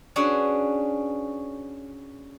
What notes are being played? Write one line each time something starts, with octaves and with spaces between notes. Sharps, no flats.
C#4 D4 F#4 G#4 B4